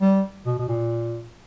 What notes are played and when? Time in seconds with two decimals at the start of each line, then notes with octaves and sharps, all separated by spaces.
0.01 G3
0.46 B2
0.59 B2
0.68 A#2